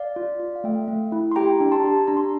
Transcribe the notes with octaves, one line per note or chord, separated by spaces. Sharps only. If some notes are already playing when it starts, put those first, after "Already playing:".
Already playing: D5 F5
F4
F4
F5
A3 E5 G5
A3
E4
C6
G4 G5 A#5
D4
A5 C6
G4
D4 A#5
C6